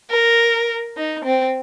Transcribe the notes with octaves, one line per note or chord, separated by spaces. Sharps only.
A#4
D#4
C4